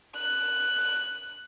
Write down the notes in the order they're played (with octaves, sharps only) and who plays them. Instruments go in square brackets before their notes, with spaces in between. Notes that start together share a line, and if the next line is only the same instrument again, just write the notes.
[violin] F#6